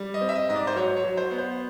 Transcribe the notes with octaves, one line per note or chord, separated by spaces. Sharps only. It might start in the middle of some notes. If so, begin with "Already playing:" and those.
Already playing: G3
D#5
C4
E5
D#5
G#2 D#5
D5
C5
F#3 C#5
C#5
F#3
C5
B3
C5